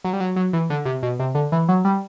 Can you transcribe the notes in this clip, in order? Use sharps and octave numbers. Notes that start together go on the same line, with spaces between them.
F#3
G3
F#3
F#3
E3
D3
C3
B2
C3
D3
E3
F#3
G3